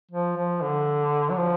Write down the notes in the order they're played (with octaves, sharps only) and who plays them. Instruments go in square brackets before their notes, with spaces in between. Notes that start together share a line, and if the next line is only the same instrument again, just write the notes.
[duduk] F3
F3
D3
F#3
F3